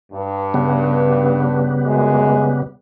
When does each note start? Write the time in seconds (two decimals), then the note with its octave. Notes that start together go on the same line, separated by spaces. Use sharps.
0.13 G2
0.54 C#3 G3 B3
1.85 F#2 G#3